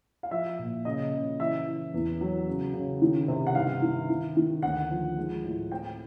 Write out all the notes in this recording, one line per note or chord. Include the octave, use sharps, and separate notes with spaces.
F5
F3 E5
A#2
C#3 D#5
C#3
E3 E5
E3
E2
F#3
C#3
C#3
D#3
C3
F#5
G2 F5
D#3
D#3
D#3
D2 F#5
F3
G#3
A2
C4 G5